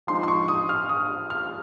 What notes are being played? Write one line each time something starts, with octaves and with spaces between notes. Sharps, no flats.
F3 G#3 D#4 C6
C6
C#6
D#6
F6
D#6
F6